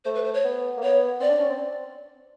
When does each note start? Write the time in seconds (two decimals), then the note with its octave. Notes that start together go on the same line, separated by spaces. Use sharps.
0.05 A3 C5
0.15 B4
0.24 C5
0.34 C#5
0.44 B3
0.77 A#3
0.83 B3 C#5
1.20 C4 D5
1.30 D4
1.40 C#4
1.50 C4